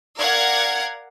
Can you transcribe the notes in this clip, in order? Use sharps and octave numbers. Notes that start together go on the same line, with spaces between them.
A#4 D5 F5 F#5 G#6